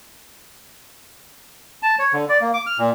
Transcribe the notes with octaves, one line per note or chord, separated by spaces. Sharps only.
A5
C#5
D3
D5
A#3
D6
F6
A#2